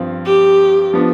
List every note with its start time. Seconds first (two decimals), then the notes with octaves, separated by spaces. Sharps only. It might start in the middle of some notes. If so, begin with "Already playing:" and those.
Already playing: G2 F3 C4
0.26 G4
0.94 F3 B3 D4